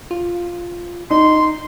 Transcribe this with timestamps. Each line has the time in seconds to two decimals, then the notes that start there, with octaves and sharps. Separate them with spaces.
0.11 F4
1.10 D#4 C6